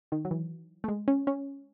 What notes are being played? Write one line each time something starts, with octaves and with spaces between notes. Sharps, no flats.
D#3
F#3
E3
A3
G#3
C#4
C#4